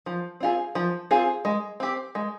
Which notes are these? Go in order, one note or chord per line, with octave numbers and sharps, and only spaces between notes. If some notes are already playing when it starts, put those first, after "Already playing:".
F3
C4 F4 G#4
F3
C4 F4 G#4
G#3
C4 G4
G#3